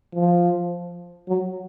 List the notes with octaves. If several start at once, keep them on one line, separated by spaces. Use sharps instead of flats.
F3
F#3